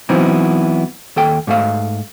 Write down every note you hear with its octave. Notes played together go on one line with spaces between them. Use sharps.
E3 F#3 B3 C4 D#4 E4
D#2 A4 G5
G#2 A3 F5